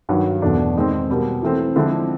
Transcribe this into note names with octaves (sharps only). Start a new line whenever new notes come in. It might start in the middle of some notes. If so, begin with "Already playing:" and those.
G2 D#3 F#3
E2 B2 F#3 A3 D4
D#3 G#3 C4
B2 G3 A#3
E3 A3 C4
D3 F3 G#3 C4 E4